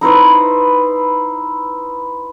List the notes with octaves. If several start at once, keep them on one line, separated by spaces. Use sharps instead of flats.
D#4 E4 B4 C5